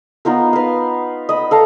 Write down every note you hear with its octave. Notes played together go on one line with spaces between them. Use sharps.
B3 D#4 F4 A#4
B4 F5
D#5 B5
A4 F5 A#5